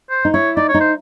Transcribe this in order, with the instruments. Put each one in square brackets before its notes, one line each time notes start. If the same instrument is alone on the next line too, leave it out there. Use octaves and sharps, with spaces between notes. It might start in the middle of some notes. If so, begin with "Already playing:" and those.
[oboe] C5
[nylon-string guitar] D#4
[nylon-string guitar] E4 [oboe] C#5
[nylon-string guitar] D#4 [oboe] D5
[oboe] C#5
[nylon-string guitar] D#4
[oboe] C5